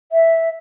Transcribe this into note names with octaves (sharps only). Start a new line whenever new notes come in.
E5